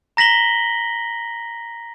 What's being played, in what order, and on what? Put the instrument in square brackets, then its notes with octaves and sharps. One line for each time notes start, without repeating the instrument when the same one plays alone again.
[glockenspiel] A#5 A#6 B6 F#7 G7